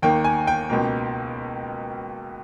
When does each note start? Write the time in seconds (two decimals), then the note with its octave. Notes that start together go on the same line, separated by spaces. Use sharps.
0.02 D#2 D#3 A#3 G5
0.24 G#5
0.47 G5
0.70 C#2 B2 A#3